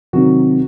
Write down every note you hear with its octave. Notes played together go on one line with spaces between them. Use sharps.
C3 D#3 F#3 F#4